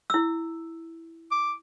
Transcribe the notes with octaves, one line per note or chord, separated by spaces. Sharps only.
E4 E6
D6